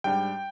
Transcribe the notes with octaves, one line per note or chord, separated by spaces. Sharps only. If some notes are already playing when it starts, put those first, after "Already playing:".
G#2 G3 D4 G5